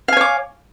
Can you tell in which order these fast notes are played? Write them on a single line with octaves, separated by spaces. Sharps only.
F5 G#5 C#5 D6